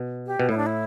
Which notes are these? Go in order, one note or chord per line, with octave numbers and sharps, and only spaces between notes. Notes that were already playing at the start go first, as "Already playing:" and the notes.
Already playing: B2
G4
B2
A2 E4
D4
E4